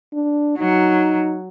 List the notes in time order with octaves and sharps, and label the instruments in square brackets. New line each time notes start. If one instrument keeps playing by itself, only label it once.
[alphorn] D4
[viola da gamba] F#3 [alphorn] D#4